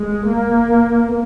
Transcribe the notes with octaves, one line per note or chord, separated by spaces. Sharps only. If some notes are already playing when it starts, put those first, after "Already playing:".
Already playing: G#3
A#3